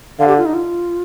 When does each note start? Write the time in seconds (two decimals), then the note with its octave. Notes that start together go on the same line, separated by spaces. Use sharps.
0.19 D3 F5
0.28 G4
0.38 F4
0.46 D#4
0.54 F4